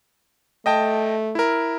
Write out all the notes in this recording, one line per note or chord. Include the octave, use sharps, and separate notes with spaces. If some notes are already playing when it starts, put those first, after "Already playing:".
A3 D#5 G5 A5
E4 A#4